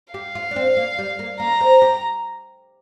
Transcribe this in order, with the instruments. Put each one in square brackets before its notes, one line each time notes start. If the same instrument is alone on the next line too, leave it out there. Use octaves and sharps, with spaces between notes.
[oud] G4 [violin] F5
[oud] F4
D4
C4
A#3
G3
A#3
[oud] A#3 [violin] A#5
[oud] C4
G4